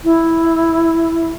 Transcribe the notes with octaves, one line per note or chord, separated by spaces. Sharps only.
E4